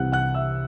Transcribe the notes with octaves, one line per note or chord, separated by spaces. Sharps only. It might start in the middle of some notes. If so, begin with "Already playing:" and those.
Already playing: C2 C3 E3 F#5 F#6
F#5 F#6
E5 E6